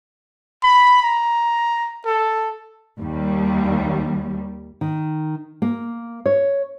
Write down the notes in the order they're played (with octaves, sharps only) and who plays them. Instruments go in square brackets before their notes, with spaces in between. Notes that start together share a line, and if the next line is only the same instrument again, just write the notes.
[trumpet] B5
A#5
A4
[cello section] D#2 G3
[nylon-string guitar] D#3
A#3
C#5